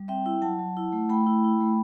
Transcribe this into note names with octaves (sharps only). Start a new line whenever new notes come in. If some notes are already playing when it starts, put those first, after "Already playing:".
Already playing: G3
C4 E5 G5
E4
F#3 F#5 A5
F#3
E4
A3
A3 G5 B5
E4
E4
A3